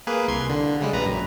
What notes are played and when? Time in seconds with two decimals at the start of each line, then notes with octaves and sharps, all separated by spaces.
0.07 A#3 G#4 B4
0.28 C2 C6 G#6
0.50 D3
0.80 C#3 G3 G#3
0.93 A#1 B4 A#5
1.06 F#2